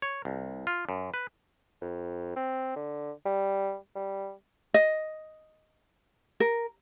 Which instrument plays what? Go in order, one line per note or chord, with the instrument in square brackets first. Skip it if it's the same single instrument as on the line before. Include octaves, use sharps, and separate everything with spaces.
[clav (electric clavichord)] C#5
C2
F4
F#2
B4
[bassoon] F2
C4
D3
G3
G3
[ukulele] D#5
A#4